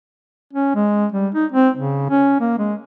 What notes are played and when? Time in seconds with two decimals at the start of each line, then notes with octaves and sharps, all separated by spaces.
0.53 C#4
0.75 G#3
1.12 G3
1.34 D#4
1.52 C4
1.76 C#3
2.10 C#4
2.40 A#3
2.58 G#3